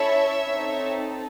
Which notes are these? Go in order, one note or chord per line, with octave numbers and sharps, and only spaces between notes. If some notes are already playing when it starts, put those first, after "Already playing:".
Already playing: C#4 E4 A4 C#5 E5
C4 D#4 A4